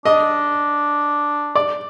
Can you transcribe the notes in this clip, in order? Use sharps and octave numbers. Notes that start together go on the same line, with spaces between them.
D4 D#5
D5